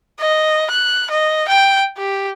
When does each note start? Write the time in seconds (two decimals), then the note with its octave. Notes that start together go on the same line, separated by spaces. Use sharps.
0.20 D#5
0.71 F#6
1.10 D#5
1.49 G5
1.97 G4